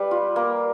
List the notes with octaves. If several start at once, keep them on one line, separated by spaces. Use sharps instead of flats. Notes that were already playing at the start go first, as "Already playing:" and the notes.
Already playing: G3 B4
F4
A#3